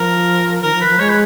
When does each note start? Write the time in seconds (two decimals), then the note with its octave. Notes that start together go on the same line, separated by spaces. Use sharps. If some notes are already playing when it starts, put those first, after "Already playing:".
Already playing: F3 A#4
0.62 D#3 A#4
0.74 F3
0.81 B4
0.87 F3
0.99 G#3 C#5
1.09 B4